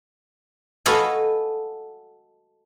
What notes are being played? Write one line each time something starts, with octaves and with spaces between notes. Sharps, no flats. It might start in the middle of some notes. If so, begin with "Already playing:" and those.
F#4 A4 B4 D#5 F5 G#5